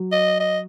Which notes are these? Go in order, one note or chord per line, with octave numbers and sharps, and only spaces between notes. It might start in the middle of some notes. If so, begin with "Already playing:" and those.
Already playing: F#3
D#5
D#5